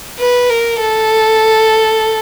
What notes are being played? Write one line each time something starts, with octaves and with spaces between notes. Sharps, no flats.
B4
A#4
A4